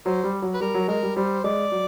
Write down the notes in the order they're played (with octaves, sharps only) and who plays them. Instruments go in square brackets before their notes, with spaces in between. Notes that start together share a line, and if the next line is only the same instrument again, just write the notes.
[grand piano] F#3 [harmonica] C5
[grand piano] G3
F#3
[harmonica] B4
[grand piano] G3 [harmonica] A#4
[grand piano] F#3
[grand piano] G#3 [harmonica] A#4
[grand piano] G3
[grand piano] G3 [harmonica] C5
[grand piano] G#3 [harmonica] D5
[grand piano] F#3